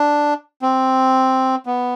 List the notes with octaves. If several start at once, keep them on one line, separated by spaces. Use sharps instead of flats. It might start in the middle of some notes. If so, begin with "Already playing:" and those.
Already playing: D4
C4
B3